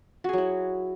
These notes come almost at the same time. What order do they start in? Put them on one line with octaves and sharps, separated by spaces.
F#4 G#4 F#3 E4